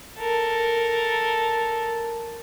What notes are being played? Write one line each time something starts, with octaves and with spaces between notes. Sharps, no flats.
A4 A#4